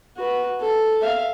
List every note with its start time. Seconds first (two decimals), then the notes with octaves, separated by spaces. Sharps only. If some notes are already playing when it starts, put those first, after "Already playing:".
0.17 F#4 B4
0.60 A4
1.02 E5 F5